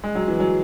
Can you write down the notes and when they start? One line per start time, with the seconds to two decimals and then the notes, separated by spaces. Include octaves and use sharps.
0.04 G#3
0.15 F#3
0.28 E3
0.40 F#3